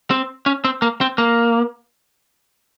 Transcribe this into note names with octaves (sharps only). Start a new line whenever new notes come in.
C4
C#4
C4
A#3
C4
A#3